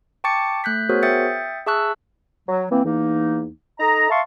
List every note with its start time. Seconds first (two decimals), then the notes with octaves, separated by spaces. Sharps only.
0.24 G5 A5 C#6 D6 A6 C#7
0.64 A3 F#6 G6 B6
0.89 B3 F#4 G#4 A#4 C5 C#5
1.03 E5 G5 D#6 G6 A6 C#7
1.66 G#4 E5 A5 C#6 E6 F#6
2.49 F#3
2.71 E3 A#3 C4
2.84 E2 E3 A#3 D#4
3.80 D#4 A4 D#5 A#5
4.10 E5 F5 A5 C6 C#6